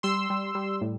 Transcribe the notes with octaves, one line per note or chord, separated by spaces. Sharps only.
G3 C6 E6
G3
G3
A2